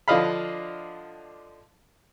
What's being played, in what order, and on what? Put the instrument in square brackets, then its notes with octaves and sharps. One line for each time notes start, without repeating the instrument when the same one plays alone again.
[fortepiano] D3 F3 D4 D#5 F5 B5